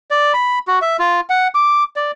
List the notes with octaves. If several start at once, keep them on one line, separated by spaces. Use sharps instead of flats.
D5
B5
F#4
E5
F4
F#5
D6
D5